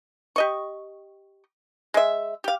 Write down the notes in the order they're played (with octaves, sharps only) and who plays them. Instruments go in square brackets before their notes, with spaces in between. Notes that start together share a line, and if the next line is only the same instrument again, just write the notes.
[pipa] G4 D#5 C#6
G#3 E5
G4 F5